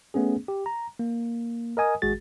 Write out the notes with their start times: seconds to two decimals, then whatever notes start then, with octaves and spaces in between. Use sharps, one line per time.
0.14 A3 B3 C#4 G#4
0.48 G4
0.66 A#5
0.99 A#3
1.77 A#4 D#5 G#5 D#6
2.02 G#1 G#3 F#4 G#4 A6